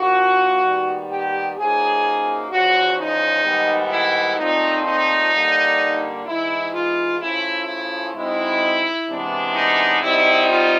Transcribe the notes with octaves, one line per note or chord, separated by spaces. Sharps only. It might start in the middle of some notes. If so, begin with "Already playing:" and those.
Already playing: A#2 F3 A#3 D4 F#4
D#2 D#3 G3 B3
G4
F#2 C#3 F3 A#3 D#4 G#4
E2 C#3 F3 F#4
D#4
G#2 D#3 G3 B3
E4
A#2 F3 A3 C4 D#4
D#4
D3 G3 A#3 D4
G#2 E3 G#3 E4
F4
C#3 F3 A3 C#4 E4
E4
B2 G#3 C4 D#4 E4
C3 E3 G#3 B3 D4
D#4
B2 G3 C4 D#4 E4
F4